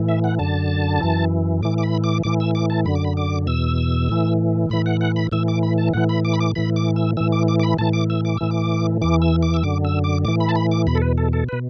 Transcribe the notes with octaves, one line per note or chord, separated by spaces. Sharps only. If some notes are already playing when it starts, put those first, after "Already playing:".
Already playing: A2 E3
E5
F#5
F#2 D3 A5
F#2 E3
A2 E3 D6
D6
B5
D6
A2 E3 D6
E6
D6
A5
F#2 D3 B5
D6
B5
D6
E2 B2 E6
A2 E3
A2 E3 B5
F#5
F#5
B5
A2 E3 E6
D6
B5
A5
A2 E3 F#5
B5
D6
B5
D6
A2 E3 B5
D6
E6
A2 E3 E6
D6
D6
D6
B5
A2 E3 A5
D6
E6
D6
A2 E3 E6
D6
E2 E3 D6
E6
D6
E6
F#2 D3 D6
E6
D6
A2 E3 D6
B5
A5
B5
D6
E2 B2 B5
A4
B4
A4
A4
B2 B4